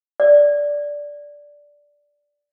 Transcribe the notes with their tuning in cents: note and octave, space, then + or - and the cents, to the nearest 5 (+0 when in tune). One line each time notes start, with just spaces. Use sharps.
D5 -10